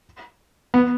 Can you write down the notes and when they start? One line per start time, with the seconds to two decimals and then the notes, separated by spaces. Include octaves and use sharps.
0.74 B3